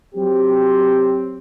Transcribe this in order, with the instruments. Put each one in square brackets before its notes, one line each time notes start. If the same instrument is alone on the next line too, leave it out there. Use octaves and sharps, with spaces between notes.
[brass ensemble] F#3 C4 G4